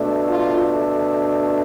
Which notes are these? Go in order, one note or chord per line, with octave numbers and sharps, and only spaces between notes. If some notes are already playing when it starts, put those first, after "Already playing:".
Already playing: B2 A3 D4
F4